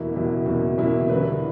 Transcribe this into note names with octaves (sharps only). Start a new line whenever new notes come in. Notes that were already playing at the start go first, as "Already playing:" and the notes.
Already playing: E2 B2 A#3 E4
E2 B2 A#3 E4
E2 B2 A#3 E4
E2 B2 A#3 E4
D3 G3 A#3 E4 B4